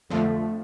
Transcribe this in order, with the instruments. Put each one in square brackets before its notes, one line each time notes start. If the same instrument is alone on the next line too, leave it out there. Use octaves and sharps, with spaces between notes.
[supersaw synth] F2 D3 F3 [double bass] A3